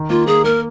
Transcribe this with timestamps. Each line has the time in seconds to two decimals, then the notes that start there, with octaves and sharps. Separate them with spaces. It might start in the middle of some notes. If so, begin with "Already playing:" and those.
Already playing: D#3
0.10 A#3 F4
0.27 A#3 G#4
0.44 A#3 A#4